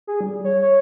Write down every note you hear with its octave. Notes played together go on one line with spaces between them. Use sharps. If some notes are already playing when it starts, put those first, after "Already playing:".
G#4
G3
C#5
C#5